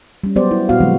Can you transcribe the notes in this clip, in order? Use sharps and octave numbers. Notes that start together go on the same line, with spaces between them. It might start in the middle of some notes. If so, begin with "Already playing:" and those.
G3 C#4
F#3 B3 G4 C5 D5
E4
A#2 B3 F#4 F5
D3 F3 F#3 G#3 C4